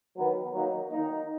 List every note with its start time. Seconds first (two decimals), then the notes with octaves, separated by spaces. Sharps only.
0.16 D#3 F#3 B3
0.54 D#3 F#3 A#3 D#4
0.91 D#3 A#3 D#4